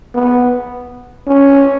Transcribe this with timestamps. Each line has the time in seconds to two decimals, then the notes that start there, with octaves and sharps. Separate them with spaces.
0.15 B3
1.27 C#4